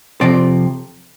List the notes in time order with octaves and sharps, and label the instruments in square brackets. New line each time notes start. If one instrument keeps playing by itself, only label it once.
[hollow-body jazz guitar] F2 C3 F3 C4 D5